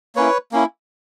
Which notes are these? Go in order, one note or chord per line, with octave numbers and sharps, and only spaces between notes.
A#3 C#4 E4 B4 C#5
A#3 C#4 E4